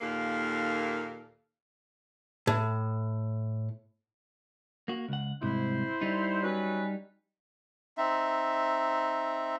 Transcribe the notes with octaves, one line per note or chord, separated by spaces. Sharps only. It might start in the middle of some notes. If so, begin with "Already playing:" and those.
D#2 A#2 A#3 A4 F5
A2
A#3 F#4
C#2 F#5
C2 G#2 C3 E4 C5
G3 D#4
F#3 C#4 B4
C4 D#4 E5